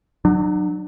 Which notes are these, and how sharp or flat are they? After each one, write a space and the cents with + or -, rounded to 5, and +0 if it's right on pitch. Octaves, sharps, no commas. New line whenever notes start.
F#3 +0 D4 +40